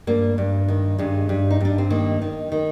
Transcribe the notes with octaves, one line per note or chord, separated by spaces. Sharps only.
G2 A#3
G2
D#3
G2 G#3
G2
D#4
G2 D4
C4
D#3 A#3
D#3
D#3